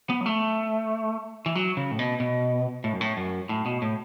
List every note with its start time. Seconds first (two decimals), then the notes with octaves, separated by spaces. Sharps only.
0.10 B3
0.21 F#3
0.26 A3
1.46 E3
1.55 F#3
1.77 C#3
1.91 A2
1.99 B2
2.20 B2
2.84 A2
2.93 F#2
3.01 A2
3.17 F#2
3.49 A2
3.66 B2
3.82 A2